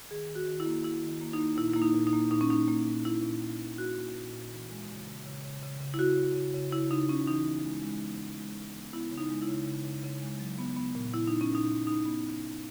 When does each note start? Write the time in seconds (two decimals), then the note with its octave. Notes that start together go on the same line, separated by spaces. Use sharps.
0.11 D#3 G#4
0.29 D#3
0.35 F#4
0.47 D#3
0.60 E4
0.66 A#3
0.84 A#3 E4
1.02 D#3
1.21 A#3
1.33 D#4
1.39 A#3
1.57 A#2 E4
1.73 A#3 E4
1.82 D#4
1.95 A#2
2.07 D#4
2.13 A#3
2.31 A#2 D#4
2.41 C#4
2.50 A#3 D#4
2.68 A#3
2.86 A#2
3.05 A#2 E4
3.23 A#2
3.42 A#3
3.60 A#2
3.78 A#3 F#4
3.97 A#3
4.15 A#2
4.33 A#2
4.52 E3
4.70 G#3
4.89 C#3
5.07 C#3
5.26 C#3
5.44 C#3
5.62 C#3
5.81 C#3
5.94 E4
5.99 C#3 F#4
6.17 C#3
6.35 C#3
6.54 C#3
6.72 C#3 E4
6.91 C#3 D#4
7.09 C#3 C#4
7.27 E3 D#4
7.46 B3
7.64 G#3
7.83 G#3
8.01 B3
8.19 G#3
8.38 G#3
8.57 G#3
8.75 B3
8.93 B3 E4
9.11 C#3
9.18 D#4
9.30 G#3
9.42 E4
9.48 C#3
9.66 C#3
9.85 C#3
10.03 C#3
10.22 G#3
10.40 F#3
10.58 B3
10.76 B3
10.95 A#2
11.14 A#2 E4
11.27 B3 D#4
11.41 C#4
11.50 A#2 D#4
11.69 A#2
11.87 A#2 D#4
12.06 B3
12.24 A#2
12.42 B3